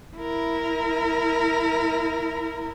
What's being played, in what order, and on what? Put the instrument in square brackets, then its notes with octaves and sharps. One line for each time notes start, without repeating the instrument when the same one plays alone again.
[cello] E4 A#4